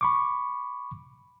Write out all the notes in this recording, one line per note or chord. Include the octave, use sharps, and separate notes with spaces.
B5 C#6 D6